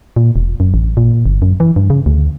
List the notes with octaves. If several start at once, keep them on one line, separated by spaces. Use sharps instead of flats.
A#2
E1
F#2
A1
A#2
G1
F#2
E3
G2
C#3
D2